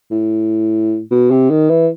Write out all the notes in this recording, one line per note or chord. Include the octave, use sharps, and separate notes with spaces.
A2
B2
C3
D#3
E3